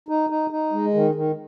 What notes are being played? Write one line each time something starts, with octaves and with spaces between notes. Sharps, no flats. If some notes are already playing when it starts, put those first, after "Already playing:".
D#4
D#4
D#4
G#3
D#3
D#3